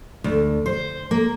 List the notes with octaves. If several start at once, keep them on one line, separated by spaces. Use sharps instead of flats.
D2
C5
A#3